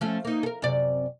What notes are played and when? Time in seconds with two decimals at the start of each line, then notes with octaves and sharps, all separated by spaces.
0.01 F3 A3 C#4
0.25 A#3 D#4
0.43 A4 A#4
0.62 F#2 C3 D5